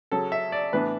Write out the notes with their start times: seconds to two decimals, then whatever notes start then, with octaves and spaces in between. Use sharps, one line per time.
0.11 C#3 F#3 C#4 A4
0.32 E5
0.52 D5
0.73 A2 E3 B3 D4 B4